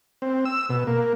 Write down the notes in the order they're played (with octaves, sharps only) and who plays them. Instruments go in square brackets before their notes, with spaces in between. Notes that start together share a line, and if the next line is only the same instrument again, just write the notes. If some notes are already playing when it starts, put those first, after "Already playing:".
[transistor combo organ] C4
E6
B2
A#3